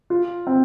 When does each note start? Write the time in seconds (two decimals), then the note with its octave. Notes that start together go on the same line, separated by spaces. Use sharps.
0.10 F4
0.47 C4